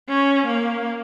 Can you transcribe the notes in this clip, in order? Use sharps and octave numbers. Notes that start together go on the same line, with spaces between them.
C#4
A#3